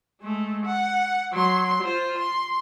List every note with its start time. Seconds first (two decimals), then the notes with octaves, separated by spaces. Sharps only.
0.21 G#3 A3
0.66 F#5
1.32 F#3 C6
1.83 F4 C5
2.19 C6